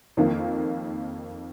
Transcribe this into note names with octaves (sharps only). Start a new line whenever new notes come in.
F2 D#3 A#3